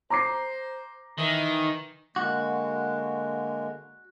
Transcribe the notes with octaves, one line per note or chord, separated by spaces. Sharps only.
C5 A#5 D6 C7
D#3 E3
D3 G#3 A#3 F#4